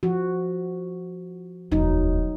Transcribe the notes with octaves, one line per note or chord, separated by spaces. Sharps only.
F3 F#4
E1 D2 F#3 D#4